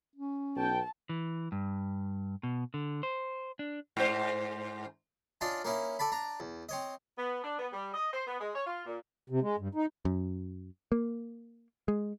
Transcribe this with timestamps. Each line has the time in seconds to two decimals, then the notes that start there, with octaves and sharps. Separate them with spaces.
0.16 C#4
0.56 B1 B3 G5 A5
1.09 E3
1.52 G2
2.43 B2
2.74 D3
3.03 C5
3.59 D4
3.97 G#2 C5
5.41 C#4 D4 F4 D5 D#5
5.64 A#3 C#4 D#4 E4
5.99 A4 D5 A5 B5
6.12 D4 A#5
6.40 E2
6.69 C4 C#5 D#5
7.18 B3
7.44 D4
7.59 B3
7.72 G3
7.94 D#5
8.13 C5
8.27 B3
8.40 G#3
8.54 C#5
8.66 F4
8.86 A#2
9.30 C3
9.42 G#3
9.58 G2
9.75 D#4
10.05 F#2
10.92 A#3
11.88 G#3